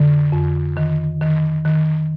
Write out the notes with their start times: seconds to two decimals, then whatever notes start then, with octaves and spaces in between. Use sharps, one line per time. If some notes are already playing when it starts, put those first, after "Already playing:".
Already playing: F2 D3
0.33 F2
0.77 D#3
1.21 D#3
1.65 D#3